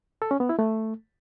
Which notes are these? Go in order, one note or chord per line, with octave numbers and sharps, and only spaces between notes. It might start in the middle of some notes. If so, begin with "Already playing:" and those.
A4
C#4
B3
E4
A3